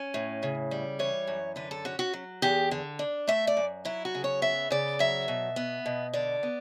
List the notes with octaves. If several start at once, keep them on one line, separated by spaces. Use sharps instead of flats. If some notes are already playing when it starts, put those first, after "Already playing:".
Already playing: C#4
A2
C#3
G3
E3 C#5
F#2
D3 B4
A4
C#4 F#4
F#4
F#3
E2 G4
D3
D4
A3 E5
D5
F#2
F#3 E4
F#4
C#3
C#5
B3 E5
C#3 D5
F#3 E5
B2
B3
B2
D3 D5
B3